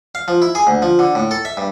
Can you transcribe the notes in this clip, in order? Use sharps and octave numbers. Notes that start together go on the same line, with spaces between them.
F5
F3
E4
G#4
D2
F3
D3
A2
A4
E5
G2